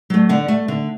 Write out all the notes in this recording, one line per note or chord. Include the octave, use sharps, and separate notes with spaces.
F#3 A3
D3 F#5
A3
D3